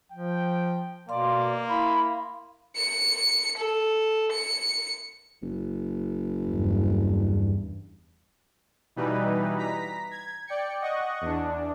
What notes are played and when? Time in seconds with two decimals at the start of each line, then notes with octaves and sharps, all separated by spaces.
0.12 F3 G5
1.09 B2 A#3 D5 F5 C6
1.68 E4 B5
2.76 C#7
3.57 A4
4.32 C#7
5.42 F#1
6.44 E2 G2
8.96 B2 E3 G3 D#4 B4
9.58 A#5 B6
10.11 G#6
10.47 D5 G5 C#7
10.82 D#5 F#5 C#6
11.21 E2 D4